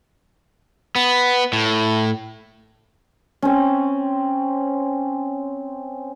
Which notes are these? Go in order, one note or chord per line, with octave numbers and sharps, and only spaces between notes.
B3
A2
C4 C#4